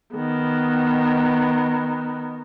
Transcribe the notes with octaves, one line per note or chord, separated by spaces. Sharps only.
D#3 B3